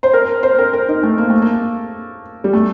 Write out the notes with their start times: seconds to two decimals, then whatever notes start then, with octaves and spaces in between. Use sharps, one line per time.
0.03 C5
0.13 A#4
0.43 C5
0.59 A#4
0.73 A#4
0.88 D#4
1.03 A3
1.18 A#3
1.30 A3
1.42 A#3
2.44 G3
2.53 A3